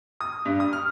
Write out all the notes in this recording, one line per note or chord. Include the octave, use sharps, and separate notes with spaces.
D#6
G2
D#6
F6